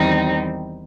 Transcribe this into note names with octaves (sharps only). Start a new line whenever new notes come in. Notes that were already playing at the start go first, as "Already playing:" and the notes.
Already playing: E2 D#3 G3 C4 D#4